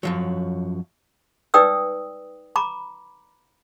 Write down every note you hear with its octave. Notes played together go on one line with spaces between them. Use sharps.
F#2 F3 F#3
D#4 B4 D5 G5 D#6 E6
A#5 B5 D6